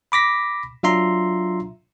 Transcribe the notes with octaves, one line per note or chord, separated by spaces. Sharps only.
B5 D6 A#6 B6
F#3 D4 F4 E5 A#5 C6